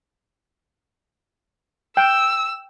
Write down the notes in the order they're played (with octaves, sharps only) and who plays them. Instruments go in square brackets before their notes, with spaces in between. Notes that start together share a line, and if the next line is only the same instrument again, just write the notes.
[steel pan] G5 [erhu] E6